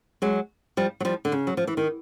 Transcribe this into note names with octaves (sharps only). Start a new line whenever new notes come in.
F#3 G#3
F3 G3
F#3
F3 G3
D3
C#3
F#3
F3
E3
D#3